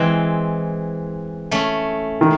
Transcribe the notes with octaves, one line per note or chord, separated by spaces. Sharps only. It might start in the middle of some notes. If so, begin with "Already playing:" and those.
Already playing: E3 G#3 C4
A3 C#4
D#3